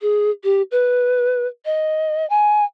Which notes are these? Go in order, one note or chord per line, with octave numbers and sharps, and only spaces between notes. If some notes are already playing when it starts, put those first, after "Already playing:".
G#4
G4
B4
D#5
G#5